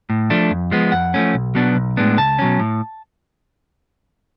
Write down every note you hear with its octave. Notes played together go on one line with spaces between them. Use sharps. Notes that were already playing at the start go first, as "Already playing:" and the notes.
A2
F3 A3 D4
F2
F3 G#3 B3
F2 F#5
F3 A3 C#4
B1
B2 F#3 B3 D4
B1
A2 G#3 B3 D4
C#2 A5
B2 F#3 C#4
A2